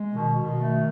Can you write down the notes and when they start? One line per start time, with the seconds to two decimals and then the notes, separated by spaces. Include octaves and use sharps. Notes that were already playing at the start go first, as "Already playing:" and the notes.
Already playing: G#3
0.13 B2 D#3
0.36 B2
0.59 D#3 A3